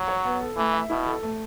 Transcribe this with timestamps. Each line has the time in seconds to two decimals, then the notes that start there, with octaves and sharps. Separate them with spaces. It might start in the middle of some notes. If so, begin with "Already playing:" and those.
Already playing: F#3
0.08 C#5
0.24 B3
0.41 A4
0.57 E3 A3
0.73 E5
0.90 B2 E4
1.06 A4
1.23 A3